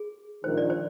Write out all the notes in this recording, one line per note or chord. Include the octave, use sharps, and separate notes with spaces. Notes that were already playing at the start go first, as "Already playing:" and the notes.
Already playing: G#4
A#1 G#2 D#3 C5
D5
C5